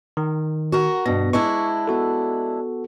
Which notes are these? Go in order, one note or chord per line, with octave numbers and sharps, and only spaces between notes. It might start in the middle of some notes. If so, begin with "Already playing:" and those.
D#3
F#4 A#4
G2 B2 D4 A#6
G#3 D4 E4 C#6
B3 F#4 A4